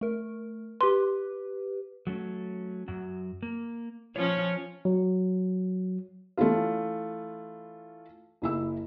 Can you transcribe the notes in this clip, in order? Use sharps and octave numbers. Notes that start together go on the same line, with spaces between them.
A3 A#4
G4 B4 C6
F#3 A3 C#4
F#2 F#3
A#3
F3 C#4 C#5
F#3
E3 A3 C#4 E4 F4
F#1 E4 E6